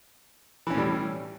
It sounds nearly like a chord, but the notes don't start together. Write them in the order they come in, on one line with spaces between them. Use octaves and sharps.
E3 C#4 A2 G3